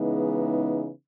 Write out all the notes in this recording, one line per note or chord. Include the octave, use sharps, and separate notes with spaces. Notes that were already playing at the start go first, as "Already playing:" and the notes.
Already playing: C#3 E3 G#3 B3 D#4